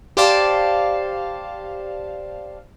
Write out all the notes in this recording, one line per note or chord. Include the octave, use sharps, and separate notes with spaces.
G4 C5 D5 F5 A5